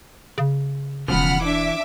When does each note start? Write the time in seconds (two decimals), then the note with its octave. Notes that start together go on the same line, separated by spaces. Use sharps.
0.38 C#3
1.08 E1 E2 C#3 F3 F#5 B5 F6
1.41 E3 D4 E5 D6